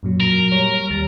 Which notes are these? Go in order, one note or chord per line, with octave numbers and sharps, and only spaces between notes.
F#2 A#2 F#3
A#4
G3 C#5
D#2 G3 A6